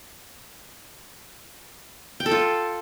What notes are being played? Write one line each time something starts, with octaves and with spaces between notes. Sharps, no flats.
G5
A4
F4